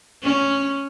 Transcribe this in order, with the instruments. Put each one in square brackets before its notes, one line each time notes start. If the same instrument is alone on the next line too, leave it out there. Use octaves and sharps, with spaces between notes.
[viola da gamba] C#4